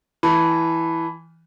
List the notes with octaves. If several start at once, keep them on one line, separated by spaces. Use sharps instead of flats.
E3 A5 B5